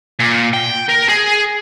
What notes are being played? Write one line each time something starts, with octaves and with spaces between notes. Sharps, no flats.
A#2
G5
A#4
G#4